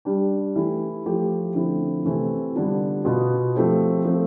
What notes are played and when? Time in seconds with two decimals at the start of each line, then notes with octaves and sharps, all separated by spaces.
0.05 G3 D4 G4
0.55 E3 A3 E4 G4
1.06 F3 A3 E4 G4
1.55 D3 F3 A3 C4 E4
2.05 C3 E3 A3 C4
2.55 D3 G3 B3 D4 F4
3.05 B2 B3 F4
3.55 F3 A3 C4 G4
4.05 F3 A3 C4